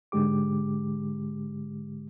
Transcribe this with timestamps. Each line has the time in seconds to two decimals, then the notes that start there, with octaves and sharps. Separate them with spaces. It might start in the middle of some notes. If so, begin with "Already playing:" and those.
0.12 G#2 D3 G#3 G4 D6